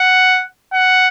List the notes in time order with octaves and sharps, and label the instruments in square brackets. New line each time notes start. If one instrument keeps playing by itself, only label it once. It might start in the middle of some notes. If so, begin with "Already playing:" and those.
Already playing: [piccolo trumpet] F#5
F#5